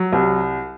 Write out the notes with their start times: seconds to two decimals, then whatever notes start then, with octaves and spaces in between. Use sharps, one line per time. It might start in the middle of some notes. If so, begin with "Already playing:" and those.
Already playing: F#3
0.13 C2